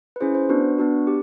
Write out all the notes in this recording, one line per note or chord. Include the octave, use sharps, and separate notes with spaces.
B4
C#4 E4 G#4 C5
C5
B3 D4 F#4 B4
B3 D4 F#4
G4